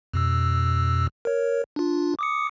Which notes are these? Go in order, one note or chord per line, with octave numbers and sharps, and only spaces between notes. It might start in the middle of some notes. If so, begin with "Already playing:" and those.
F2 B2 E6
A#4 C#5
D4 F4
D6 D#6 C#7